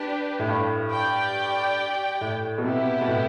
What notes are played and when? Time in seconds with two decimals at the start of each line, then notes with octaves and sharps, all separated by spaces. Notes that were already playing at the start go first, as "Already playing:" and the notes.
Already playing: D4 G4 B4
0.39 A2
0.48 G2
0.92 G4 D5 G5
2.21 A2
2.58 B2
2.64 C3 B3 E4 G4
3.01 B2
3.08 A2